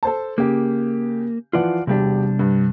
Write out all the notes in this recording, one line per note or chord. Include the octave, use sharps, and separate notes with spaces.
A4 C5 A5
C#3 A#3 G4
E3 F3 F4 D5 F#5
E1 C3 G3 D4 G4
G2